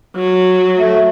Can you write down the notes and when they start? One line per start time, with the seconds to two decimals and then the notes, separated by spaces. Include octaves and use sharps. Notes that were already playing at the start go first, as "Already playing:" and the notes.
0.16 F#3
0.78 A3